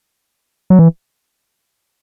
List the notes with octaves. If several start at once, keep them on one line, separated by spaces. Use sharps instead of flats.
F#3
E3